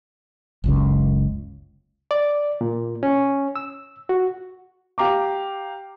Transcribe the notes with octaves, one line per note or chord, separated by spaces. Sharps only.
F#1 C#2 C#3
D5
A#2
C#4
E6
F#4
G4 F5 A#5 D6